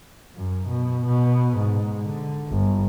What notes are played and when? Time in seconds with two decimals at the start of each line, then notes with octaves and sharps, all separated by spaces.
0.35 F#2
0.68 B2
1.07 B2
1.58 G#2
2.05 D3
2.49 G1